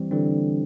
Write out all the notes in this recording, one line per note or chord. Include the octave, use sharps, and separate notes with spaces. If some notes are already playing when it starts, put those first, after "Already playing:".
Already playing: E3 G3 C4
D3 E3 G3 C4